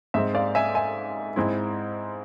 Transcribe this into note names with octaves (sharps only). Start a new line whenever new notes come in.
G#2 G#3 C4 E5
D5 F5
E5 G#5
E5 G#5
G#2 G#3 C4 E4